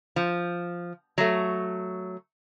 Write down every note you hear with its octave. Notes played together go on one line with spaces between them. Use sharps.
F3
F#3 A3